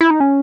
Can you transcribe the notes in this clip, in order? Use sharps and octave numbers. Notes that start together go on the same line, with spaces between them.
E4
D#4
C#4